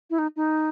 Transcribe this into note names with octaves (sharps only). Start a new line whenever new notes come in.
E4
D#4
D#4